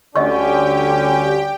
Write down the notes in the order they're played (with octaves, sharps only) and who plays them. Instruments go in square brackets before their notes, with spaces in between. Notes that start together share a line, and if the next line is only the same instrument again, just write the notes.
[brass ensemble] D2 G3 C#4 [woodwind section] D3 [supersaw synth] G4 G5 [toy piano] D#5 C#6